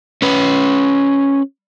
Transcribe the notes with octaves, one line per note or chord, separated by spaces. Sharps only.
C#4 B4